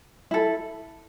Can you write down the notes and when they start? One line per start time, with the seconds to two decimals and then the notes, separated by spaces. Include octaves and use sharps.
0.31 E4 A4